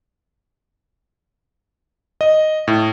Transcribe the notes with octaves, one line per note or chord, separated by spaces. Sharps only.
D#5
A2